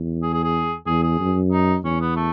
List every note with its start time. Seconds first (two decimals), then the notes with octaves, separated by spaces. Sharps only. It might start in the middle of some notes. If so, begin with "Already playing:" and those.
Already playing: E2
0.23 G#4
0.33 G#4
0.44 G#4
0.87 E2 G#4
1.03 G#4
1.20 F#2
1.52 D#4
1.84 E2 C#4
2.01 B3
2.16 A3